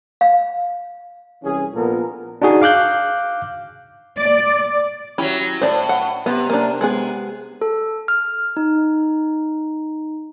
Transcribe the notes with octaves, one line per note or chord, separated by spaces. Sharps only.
F5
C2 E3 C#4 G#4
A#1 A#2 B3 A4 A#4
D4 D#4 F#4 G#4
F5 D6 F#6 G6
D5
F#3 C#4 E4 G4
A2 C5 D5
F#5
C3 B3
A#3 D4
G#3 B3 G#4
A4
F6
D#4